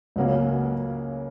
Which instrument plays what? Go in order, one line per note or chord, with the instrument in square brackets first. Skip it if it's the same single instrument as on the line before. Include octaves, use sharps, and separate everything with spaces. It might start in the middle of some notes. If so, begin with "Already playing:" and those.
[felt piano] C#2 C#3 F#3 A#3 C#4